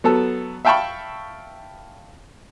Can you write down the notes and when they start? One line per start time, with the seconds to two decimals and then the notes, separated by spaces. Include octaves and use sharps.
0.04 F#3 B3 A4 A5
0.65 E5 F5 G5 A5 B5 C#6